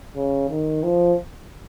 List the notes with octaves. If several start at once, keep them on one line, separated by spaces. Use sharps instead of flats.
C#3
D#3
F3